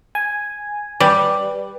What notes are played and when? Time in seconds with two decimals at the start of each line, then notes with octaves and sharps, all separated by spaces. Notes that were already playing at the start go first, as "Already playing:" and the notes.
0.15 G#5
1.00 G3 B4